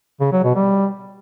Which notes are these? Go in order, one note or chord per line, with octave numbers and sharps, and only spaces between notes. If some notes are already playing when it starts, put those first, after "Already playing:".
C#3
F#3
B2
G3